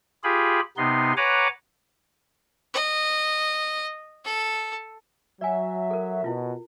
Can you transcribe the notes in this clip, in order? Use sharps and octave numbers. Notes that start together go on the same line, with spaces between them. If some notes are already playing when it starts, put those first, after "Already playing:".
F4 G4 G#4 B5
C3 B3 D#4 C6
B4 C#5 F#5 G#5 A#5 D6
D#5
A4
F#3 D5 E5 G#5
A4 A#4
B2 E4 F4